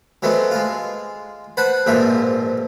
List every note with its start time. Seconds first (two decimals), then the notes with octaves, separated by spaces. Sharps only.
0.22 F#3 G#3 A3 B3 C4
0.51 G#3 F4
1.57 B4 C5 F#5 A5 B5
1.86 A#1 G#2 B2 F3 A#3 E5